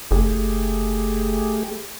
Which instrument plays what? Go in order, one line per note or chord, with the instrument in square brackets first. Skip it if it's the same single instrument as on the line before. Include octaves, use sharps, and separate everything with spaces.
[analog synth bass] F#1 [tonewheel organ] A3 G4 G#4